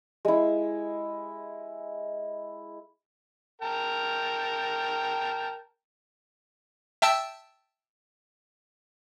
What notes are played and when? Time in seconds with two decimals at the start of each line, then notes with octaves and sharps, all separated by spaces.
0.25 G#3 E4
3.62 A#4 G5 A5
7.02 E5 G5 A5 E6